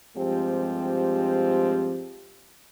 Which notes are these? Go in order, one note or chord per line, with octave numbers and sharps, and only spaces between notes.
G2 F3 G#3 C4 G4